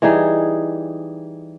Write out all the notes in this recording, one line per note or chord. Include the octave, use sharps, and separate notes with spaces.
E3 G3 D#4 G#4